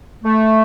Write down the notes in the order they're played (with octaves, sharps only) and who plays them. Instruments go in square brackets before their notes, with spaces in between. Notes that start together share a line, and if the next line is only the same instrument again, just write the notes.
[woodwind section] A3